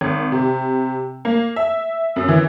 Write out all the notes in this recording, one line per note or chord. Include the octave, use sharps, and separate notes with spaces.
G#1
C3
A#3
E5
F#2
E3